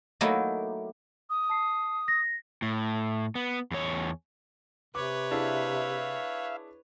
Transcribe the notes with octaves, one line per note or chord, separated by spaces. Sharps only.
F#3 A3 A#3 D#4 E4
D#6
A5 C7
A#6
A2
B3
E2 C#5
C3 B4 C#5 D6
D4 E4 G#4 E5 F5